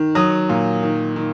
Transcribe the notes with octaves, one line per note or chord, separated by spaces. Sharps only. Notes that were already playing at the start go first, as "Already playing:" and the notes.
Already playing: D#3
F#3 D#6
A#2
D#3
D#3